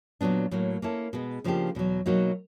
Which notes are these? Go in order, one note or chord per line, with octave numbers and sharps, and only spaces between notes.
A#2 F#3 B3 D4
A2 F#3 A#3
A#3 C#4 E4 A4
B2 G#3 B3
C#3 F3 A#3 D4 G4
E2 B2 F#3
B2 F#3 A#3 D#4 F#4